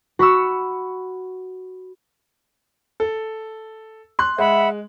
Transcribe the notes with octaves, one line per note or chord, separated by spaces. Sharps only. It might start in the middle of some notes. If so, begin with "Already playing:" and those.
F#4 B5 C#6 E6
A4
C6 F#6
G#3 E5 F#5 B5